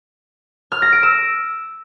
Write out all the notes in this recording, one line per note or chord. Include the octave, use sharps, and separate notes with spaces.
F6
A#6
D7
E6